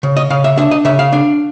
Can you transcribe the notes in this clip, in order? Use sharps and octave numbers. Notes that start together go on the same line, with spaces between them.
C#3
D#5
C#3 F5
E5
D4 E5
D#5
C#3 E5
F5
D4